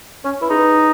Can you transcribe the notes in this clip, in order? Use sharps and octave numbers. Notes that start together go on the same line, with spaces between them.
C#4 C#5
E4 B4
D#4 G#4
B4